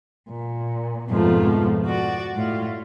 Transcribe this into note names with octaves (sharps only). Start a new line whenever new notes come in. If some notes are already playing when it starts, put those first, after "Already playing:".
A#2
F2 G#2 B2 F3 A3 F4
F#4 D5
A2 F4